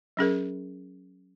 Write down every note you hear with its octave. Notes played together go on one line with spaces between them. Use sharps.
F#3 C#4 G#4 A#4